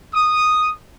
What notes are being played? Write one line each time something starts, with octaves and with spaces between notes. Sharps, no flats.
D#6